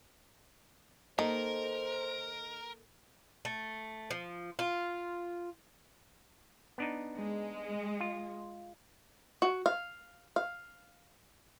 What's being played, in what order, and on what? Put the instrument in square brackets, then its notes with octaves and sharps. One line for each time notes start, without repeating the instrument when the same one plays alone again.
[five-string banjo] D#3 [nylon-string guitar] A#3 A4 [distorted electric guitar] A#4 [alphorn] C5
[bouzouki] A3
F3
F4
[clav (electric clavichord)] B3 D4 D#4
[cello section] G#3
[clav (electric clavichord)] F4
[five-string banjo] F#4
F5
F5